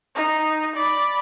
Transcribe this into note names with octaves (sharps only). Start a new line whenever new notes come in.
D#4
D5 B5